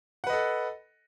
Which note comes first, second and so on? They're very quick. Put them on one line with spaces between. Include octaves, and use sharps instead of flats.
F#5 B4 D#5 A4